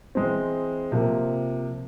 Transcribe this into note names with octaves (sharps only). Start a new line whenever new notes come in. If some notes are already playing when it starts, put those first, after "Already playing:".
E3 G#3 C4
C3 F3 A#3